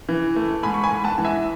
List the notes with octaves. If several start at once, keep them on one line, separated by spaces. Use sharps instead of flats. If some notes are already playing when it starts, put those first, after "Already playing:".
E3
A3
G#2 G#5 B5
C#6
G#5 B5
G#2
F#5 A5
E3
E5 G#5